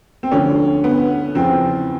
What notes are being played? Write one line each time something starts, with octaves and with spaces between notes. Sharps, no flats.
C4
D2 D3 F3 C#4
B3
E2 C#3 F3 C4